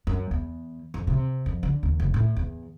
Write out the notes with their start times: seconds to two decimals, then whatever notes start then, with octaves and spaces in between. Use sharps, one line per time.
0.07 F#2
0.31 E2
0.94 F2
1.07 C3
1.46 F2
1.63 D3
1.83 D#2
2.00 F1
2.14 A2
2.37 E2